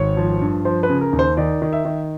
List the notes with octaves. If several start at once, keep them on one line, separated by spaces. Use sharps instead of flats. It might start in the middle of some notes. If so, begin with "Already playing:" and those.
Already playing: G#1 C#5
F3
G2
F3 C5
B4
C#3
A#4
D#2
C5
D#3 D5
D#3
E5
D#3